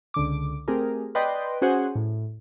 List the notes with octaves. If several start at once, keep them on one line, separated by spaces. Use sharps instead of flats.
C#2 D3 D6
A3 C4 G4 G#4 A#4
B4 D5 D#5 G5 C6
C#4 F#4 G#4 C5 F#5 G#5
A2